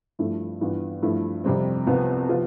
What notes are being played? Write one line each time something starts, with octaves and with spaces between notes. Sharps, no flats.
G2 F3 A3 E4
G2 E3 B3 F4
G2 F3 A3 E4
F2 C3 G3 C4
C2 C3 F3 B3
C3 F3 B3 F4